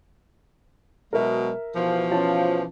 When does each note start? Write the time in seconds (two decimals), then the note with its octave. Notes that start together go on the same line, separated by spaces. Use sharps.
1.13 B2 F#3 G#3 A#4 E5
1.75 B2 E3 F3
2.11 C#4 F4 A5